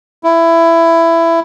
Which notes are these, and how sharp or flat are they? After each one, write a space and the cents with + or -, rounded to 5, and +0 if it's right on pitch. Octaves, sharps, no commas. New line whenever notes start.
E4 +15